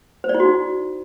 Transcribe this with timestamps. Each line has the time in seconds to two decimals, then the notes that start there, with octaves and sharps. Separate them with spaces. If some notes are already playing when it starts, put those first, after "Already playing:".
0.24 C5
0.29 D5
0.35 E4
0.40 F#4
0.45 D#4